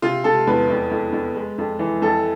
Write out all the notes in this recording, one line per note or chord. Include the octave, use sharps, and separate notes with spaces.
C3 F4
C3 A4
E2 B4
F2
F2
F2
G#3
F2
E3
F2 A4